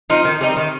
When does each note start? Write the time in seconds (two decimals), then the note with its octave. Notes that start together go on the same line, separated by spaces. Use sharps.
0.10 F3 C4 D#4
0.25 D#3
0.41 G3 C4 D#4
0.57 D#3